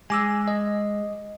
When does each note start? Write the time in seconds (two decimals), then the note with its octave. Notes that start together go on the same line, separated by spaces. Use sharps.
0.10 G#3 G#5 D6 E6
0.48 D#5